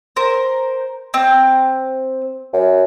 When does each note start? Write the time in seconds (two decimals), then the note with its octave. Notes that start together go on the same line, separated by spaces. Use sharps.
0.16 A#4 C5
1.14 C4
2.53 F#2